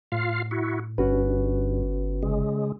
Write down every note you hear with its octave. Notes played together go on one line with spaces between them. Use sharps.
A2 F4 F5
E4 F#4
G1 G2 C#4 F#4 B4
C#3 G#3